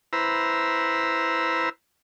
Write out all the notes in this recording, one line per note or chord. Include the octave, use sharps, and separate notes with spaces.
E4 B4 C5 A#5 E6